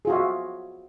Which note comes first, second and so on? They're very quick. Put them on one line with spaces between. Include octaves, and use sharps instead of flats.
G#4 F4 F#4 E5